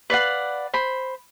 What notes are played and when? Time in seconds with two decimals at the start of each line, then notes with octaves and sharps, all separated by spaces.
0.10 B4 D5 F5 F#5
0.74 C5 B5